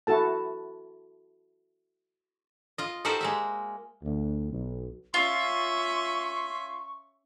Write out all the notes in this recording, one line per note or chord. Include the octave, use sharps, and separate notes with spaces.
E4 F#4 A4 A5
F4 D#5
D#4 F#4 G4 A4 A#4 C5
G#3 A#3 E5
D2
B1
C#4 F4 E5 C6 C#6